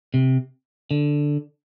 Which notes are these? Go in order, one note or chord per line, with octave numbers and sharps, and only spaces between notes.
C3
D3